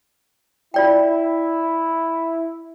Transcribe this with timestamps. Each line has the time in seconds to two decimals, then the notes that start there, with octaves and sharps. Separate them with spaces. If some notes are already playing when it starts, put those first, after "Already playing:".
0.74 E4 F4 D5 G5